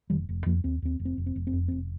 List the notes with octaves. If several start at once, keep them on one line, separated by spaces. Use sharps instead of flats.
F1 D#3 G3
F1
F2 F3 A#3
D#2 C4
D#2 C4
F1
C4
F1
C4
F1
C4
F2
F1 C4